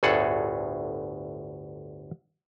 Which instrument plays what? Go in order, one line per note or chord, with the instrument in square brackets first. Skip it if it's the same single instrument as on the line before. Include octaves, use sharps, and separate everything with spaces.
[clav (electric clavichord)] G1 D2 A2 G#4 A4 F#5